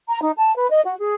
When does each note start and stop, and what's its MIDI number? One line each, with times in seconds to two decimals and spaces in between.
0.08 0.20 82
0.21 0.31 63
0.37 0.54 81
0.55 0.69 71
0.70 0.81 75
0.84 0.96 66
1.00 1.15 68